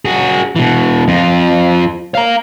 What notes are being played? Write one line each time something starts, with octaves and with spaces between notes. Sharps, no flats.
F#4 G#4
B2 E3
F2 F4
F5 A#5